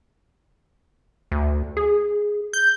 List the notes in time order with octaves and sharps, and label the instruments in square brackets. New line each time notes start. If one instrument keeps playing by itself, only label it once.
[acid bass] D2
G#4
[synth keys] G6